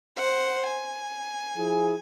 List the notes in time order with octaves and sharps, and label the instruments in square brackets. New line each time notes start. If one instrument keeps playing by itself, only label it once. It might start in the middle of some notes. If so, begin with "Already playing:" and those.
[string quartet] C5 F#5
G#5
[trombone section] F3 E4 G#4